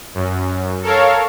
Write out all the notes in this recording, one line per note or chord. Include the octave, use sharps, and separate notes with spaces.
F#2
A4 A#4 C#5 F5